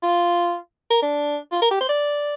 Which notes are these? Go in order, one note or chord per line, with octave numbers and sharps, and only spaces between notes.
F4
A#4
D4
F4
A#4
G4
C5
D5